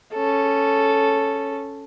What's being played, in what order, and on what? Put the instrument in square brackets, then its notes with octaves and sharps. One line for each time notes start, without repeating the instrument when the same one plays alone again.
[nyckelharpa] C#4 A4